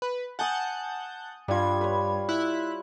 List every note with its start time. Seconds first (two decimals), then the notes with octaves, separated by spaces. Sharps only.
0.02 B4
0.39 F#5 G#5 A5 D#6 G6
1.48 G2 G3 F4 G#6
1.81 B4 C#5
2.29 E4 F#6